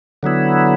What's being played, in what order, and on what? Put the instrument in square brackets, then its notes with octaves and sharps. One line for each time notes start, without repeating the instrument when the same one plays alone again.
[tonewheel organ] D3 F#3 B3 E4